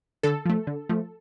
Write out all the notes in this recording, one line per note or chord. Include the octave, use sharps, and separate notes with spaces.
D3 A4
F3 A3
D3
F3 A3